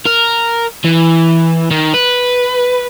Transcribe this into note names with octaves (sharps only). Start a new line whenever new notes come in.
A#4
E3
D#3
B4